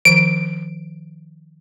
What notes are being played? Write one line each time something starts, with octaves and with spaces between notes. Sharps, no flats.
D#3 F3 D7